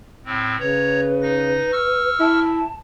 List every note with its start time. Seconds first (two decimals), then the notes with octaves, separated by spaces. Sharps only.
0.25 A2 C4
0.59 C#3 B4 C#5 A#5
1.22 D#4 A#6
1.72 C#6 E6 F6
2.20 E4 A5